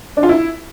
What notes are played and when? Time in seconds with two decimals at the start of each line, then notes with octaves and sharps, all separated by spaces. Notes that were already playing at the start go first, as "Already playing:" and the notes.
0.17 D4
0.23 F4
0.29 E4